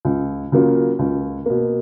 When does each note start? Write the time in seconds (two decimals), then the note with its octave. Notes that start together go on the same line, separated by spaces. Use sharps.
0.05 C#2
0.52 C#3 F#3 A#3 F4
0.99 C#2
1.46 B2 A#3